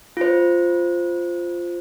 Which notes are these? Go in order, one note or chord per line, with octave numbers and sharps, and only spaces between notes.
F4 C5